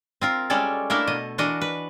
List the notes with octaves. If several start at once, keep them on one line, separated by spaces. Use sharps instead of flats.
C4 F4 A#4
G3 G#3 C#4 A4 D5
A3 A#3 D4 E4 A4 A#4
B2 D#5
E3 D4 F#4 A#4 D#5
B4